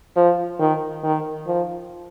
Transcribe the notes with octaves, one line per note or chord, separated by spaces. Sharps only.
F3
D#3
D#3
F3